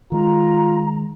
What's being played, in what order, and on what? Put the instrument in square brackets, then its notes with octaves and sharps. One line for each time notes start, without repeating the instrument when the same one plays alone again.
[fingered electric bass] D#3 G#3 [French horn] F4 [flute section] A#5